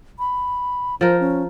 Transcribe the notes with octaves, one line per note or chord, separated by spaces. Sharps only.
B5
F3 A#4 C5
C#4